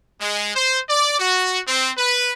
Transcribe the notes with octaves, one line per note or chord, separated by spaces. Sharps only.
G#3
C5
D5
F#4
C4
B4